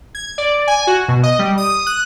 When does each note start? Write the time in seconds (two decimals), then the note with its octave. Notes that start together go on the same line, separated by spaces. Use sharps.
0.15 G#6
0.38 D5
0.67 G#5
0.87 F#4
1.08 B2
1.23 D#5
1.39 G3
1.58 D#6
1.86 F#6